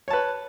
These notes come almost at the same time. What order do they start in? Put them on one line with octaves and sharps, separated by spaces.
C#5 A5 B4